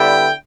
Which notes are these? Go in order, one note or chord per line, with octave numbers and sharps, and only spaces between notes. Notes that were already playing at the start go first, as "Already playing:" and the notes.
Already playing: D3 G3 B3 E4 G5